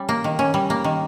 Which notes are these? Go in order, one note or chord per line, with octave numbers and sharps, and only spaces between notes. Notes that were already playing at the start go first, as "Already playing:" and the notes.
Already playing: G3 C#4
A#3
D#3
C#4
G3
A#3
D#3